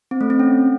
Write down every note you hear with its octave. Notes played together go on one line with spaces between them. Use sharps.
C4
A3
C4
C#4